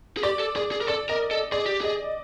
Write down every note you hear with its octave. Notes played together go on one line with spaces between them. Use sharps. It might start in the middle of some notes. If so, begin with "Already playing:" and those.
G#4
G4 D5
A4
G#4 D5
G#4
A#4
A4 D5
A#4 D#5
A4
G#4 D5
G4
G#4 D#5